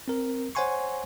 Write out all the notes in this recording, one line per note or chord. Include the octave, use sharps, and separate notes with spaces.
C4 A#4
C5 C#5 F#5 G#5 C6 C#6